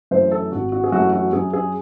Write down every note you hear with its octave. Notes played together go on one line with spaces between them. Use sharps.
F#2 E3 A3 C5
A4
G#1 F#4
F#4
G#4
F#2 E3 A3 F#4
F#4
F#2 G#4
G#4